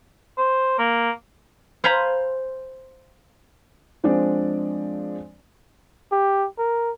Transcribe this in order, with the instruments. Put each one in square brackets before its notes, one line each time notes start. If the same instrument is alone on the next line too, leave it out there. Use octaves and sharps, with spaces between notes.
[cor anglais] C5
A#3
[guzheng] C5 F5 G#5 A#5 B5
[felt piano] F3 G#3 C4 D4 D5
[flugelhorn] G4
A#4